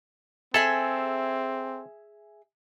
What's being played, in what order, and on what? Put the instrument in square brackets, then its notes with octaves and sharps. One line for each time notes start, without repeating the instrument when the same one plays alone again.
[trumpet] C4 [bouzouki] G#4 E5 G#5 [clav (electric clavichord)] A4